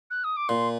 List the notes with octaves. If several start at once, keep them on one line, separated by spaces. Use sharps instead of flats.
F#6
D#6
D6
A#2 C6